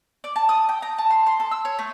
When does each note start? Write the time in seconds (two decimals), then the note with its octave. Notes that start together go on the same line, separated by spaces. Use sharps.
0.24 D5
0.36 A5
0.49 D#6
0.69 G5
0.82 A#5
0.98 A5
1.10 C6
1.27 C6
1.40 A4
1.51 E6
1.65 C#5
1.79 A3